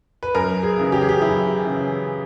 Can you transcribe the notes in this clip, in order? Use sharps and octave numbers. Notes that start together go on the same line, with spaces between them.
B4
F#2 A#4
G#4
C#3 E3
G4
G#4
G4
F#2 E4
C#3 E3